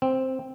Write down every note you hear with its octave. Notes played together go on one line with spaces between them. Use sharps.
C4